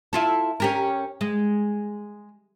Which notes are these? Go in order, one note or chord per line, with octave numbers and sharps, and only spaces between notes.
E4 F4 A4
C#4 G4 A#4
G#3